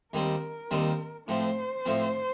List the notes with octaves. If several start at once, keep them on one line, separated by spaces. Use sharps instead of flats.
D#2 D#3 G3 C4 A#4
D#2 D#3 G3 C4
A2 F3 C4 C5
A2 F3 C4